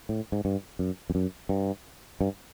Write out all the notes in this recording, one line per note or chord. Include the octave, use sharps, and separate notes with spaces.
A2
G#2
G2
F#2
F2
F#2
G2
G2